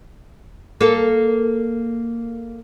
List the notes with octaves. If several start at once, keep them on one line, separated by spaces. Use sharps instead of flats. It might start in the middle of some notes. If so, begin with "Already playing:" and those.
A#3 A4